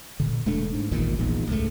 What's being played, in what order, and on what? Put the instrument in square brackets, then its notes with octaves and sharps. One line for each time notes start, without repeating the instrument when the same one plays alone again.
[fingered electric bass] A#2 D3
E1 G#3 A3 D4
G#2
A1 E2 A#2 D#3
D#1 A#1 E2 G#2
C#2 G#2 A3